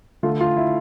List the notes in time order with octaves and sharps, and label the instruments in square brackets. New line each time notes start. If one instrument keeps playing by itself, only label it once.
[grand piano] D3 A3 F4
F4
E4